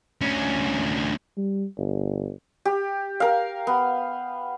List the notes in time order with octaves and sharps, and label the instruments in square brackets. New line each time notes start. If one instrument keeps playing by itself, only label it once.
[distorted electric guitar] D2 C#4
[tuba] G3
G1
[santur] G4
A#4 F5
B3